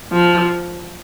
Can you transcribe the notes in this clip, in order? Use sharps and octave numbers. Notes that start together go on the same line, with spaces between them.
F3